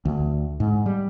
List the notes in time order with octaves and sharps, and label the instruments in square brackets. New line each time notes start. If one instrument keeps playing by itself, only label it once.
[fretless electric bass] D2
G#2
G3